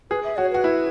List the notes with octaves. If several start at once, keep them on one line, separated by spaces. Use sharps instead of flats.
G#4 B4
E5
F#4 C#5
F#4 B4
E4